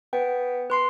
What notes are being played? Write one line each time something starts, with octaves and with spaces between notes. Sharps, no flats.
B3 G5
B4 C6 C7